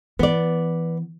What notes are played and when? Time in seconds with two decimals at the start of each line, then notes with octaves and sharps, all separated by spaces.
0.19 E3 B3 D5